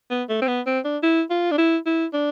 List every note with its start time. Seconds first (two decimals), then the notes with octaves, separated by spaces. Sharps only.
0.10 B3
0.29 A3
0.41 C4
0.47 B3
0.66 C4
0.84 D4
1.02 E4
1.30 F4
1.51 D4
1.58 E4
1.86 E4
2.13 D4